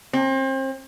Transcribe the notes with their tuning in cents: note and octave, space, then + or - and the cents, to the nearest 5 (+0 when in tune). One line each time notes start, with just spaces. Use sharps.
C4 +35